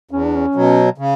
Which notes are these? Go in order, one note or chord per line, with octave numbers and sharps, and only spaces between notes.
E2 C#4
D4
C#4
B2 F#3
C#3